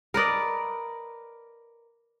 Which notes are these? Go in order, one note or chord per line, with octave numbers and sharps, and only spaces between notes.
A#4 B4 D5 D#5